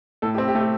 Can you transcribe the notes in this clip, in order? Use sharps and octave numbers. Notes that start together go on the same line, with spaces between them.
A2 A4
G4
C4
G4
A3
G4